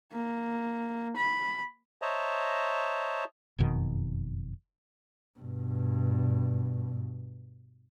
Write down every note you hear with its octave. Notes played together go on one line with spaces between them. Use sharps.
A#3
B5
C5 C#5 D#5 E5 A5 A#5
F#1 F2 B2 D#3
G2 B2